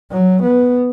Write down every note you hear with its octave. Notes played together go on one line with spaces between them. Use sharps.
F#3
B3